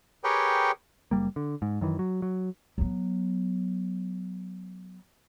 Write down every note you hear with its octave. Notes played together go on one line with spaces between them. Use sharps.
G4 G#4 A#4 B4 C#5 G5
F#1 G3 A#3
D3
G#2
F#2 D#3 E3
F#3
F#3
F#3 B3